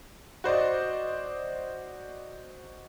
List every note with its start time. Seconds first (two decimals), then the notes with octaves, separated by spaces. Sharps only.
0.44 F#4 C5 D5 D#5